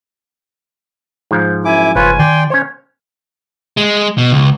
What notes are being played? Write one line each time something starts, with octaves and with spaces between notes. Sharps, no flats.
G#2 F3
F#2 E4 G#5 D6
F#1 F4 B4 C#5 G#5
D#3 D5 G5 C6
C#4 C5 C#5
G#3
B2
C#2